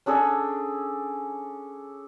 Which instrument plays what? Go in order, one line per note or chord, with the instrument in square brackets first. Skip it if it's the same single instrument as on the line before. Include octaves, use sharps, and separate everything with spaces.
[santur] C#4 D4 G#4 A4